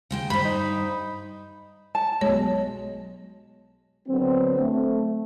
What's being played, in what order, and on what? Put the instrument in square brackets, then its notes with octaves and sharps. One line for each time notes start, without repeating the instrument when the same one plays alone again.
[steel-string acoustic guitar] C#3 G#3 G5
[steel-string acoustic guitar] G2 C5 [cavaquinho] B5
[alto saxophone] D#4
[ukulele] A5
[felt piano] B1 G#3 [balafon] C#5
[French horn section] D3 F#3 B3 C4
A3